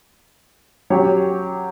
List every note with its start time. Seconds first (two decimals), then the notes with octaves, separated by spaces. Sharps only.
0.90 F#3 C#4 G4 C#5